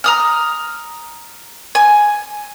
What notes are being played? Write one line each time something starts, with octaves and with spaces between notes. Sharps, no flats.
A#5 D#6 F6
G#5